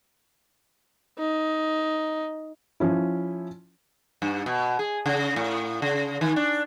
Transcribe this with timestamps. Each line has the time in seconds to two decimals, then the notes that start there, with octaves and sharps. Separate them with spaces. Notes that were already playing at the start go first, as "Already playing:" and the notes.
1.19 D#4
2.80 F3 C#4 E4
4.22 G2
4.46 B2
4.79 G#4
5.06 C#3
5.36 A2
5.82 C#3
6.21 D#3
6.36 D4